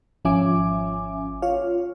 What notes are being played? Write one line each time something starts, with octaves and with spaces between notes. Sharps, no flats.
G#1 F3 C#4 E5 G#5 D6
F4 C#5 F5